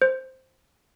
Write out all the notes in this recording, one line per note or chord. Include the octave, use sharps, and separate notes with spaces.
C5